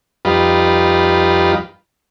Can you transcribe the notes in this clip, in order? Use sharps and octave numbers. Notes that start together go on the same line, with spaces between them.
F2 G3 D#4 F4 B4